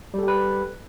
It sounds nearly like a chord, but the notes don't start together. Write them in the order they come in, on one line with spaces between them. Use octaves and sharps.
G3 A4 G4 B4